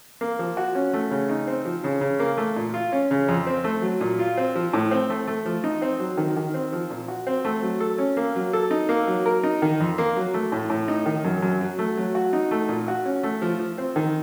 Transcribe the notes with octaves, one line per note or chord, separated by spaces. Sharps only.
A#3
F3
F#4
C#4
A3
C#3
D#4
C4
F3
C#3
C#3
A#3
A3
A#2
F4
C#4
C#3
F2
C4
A3
F#3
A#2
F4
C4
F3
A2
C4
A3
A3
F3
D#4
C4
F#3
D#3
D#3
C4
F3
A#2
F#4
C4
A3
F#3
A4
C#4
A#3
F#3
A4
D#4
A#3
F#3
A#4
D#4
D#3
F2
A#3
F#3
A3
A2
A2
D#4
D#3
F#2
F#2
F#3
A3
F#3
F#4
D#4
A3
A#2
F#4
C#4
A3
F3
F3
C4
D#3